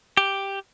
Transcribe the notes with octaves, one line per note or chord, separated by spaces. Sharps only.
G4